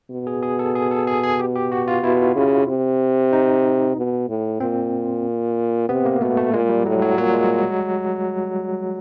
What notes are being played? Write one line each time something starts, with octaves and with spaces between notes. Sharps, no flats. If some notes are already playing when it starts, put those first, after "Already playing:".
B2
G#4
G#4
A4
G#4
A4
G#4
G#4
G4
G4
F#4
F4
B2 E4
C#3
C3
D#4
B2
A2
A#2 C4
C3 B3
A#3
B2 A3
A3
A#2 G#3
G3
A2 F#3
F#3
A#2 F#3
G#3